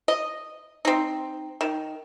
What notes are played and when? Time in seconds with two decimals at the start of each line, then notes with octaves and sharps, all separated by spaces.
0.08 D#5
0.85 C4 D#4
1.61 D#3